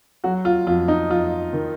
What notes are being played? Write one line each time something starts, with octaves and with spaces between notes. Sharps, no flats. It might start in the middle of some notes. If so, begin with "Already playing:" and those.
F#3 F#4
F4
F2 F4
D#4
F2 F4
D#3